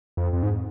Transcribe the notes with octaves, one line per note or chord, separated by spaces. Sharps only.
F2
F2
G#2